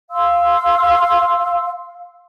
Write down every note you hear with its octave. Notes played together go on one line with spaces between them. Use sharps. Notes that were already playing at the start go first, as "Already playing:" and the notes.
F5 C6 E6